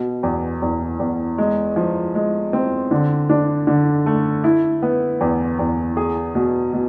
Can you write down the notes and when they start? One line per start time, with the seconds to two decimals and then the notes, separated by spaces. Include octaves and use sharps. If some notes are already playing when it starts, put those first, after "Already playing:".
Already playing: B2
0.23 E2
0.62 E2
0.99 E2
1.38 G#3
1.76 F3
2.15 G#3
2.53 C4
2.91 D3
3.29 D4
3.67 D3
4.06 A3
4.44 E4
4.82 B3
5.21 E2
5.59 E2
5.97 G#4
6.35 B2
6.73 B2